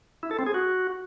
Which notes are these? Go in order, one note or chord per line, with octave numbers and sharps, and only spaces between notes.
E4
A4
C4
G#4
F#4